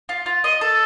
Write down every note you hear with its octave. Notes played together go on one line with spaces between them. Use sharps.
F4
F4
D#5
A4